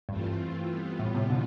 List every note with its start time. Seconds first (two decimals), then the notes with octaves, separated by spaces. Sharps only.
0.09 G2 E3 A3 C4 F4
0.69 E3 G3 B3 F4
1.00 A2
1.15 A2 C3
1.30 B2 D3